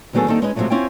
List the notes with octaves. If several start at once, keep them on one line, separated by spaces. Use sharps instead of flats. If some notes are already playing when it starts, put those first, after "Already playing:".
D2 D#3 F#3 B3 G#4 A4
D#3 G3 A#3 C4 D#4 A4
G#3 C#4 D#4 B4 D#5
G#2 C3 D#3 F3 F#3 A3
C4 C#4 E4 F4 G5